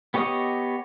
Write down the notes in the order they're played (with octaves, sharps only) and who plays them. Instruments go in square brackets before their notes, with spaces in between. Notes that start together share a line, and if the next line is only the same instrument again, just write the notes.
[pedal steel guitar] B3 G4 C#5 D#5 D#6